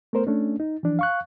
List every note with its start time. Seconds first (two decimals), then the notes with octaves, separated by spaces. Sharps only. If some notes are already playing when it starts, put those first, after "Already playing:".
0.13 A3 B3 A#4 C5
0.27 A3 C#4 D4
0.60 D#4
0.83 E3 F3 D4
0.99 F5 C#6 F#6